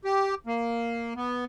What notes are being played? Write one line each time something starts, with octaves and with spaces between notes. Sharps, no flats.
G4
A#3
B3